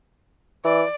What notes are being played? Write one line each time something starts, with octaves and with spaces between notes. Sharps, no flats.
E3 D5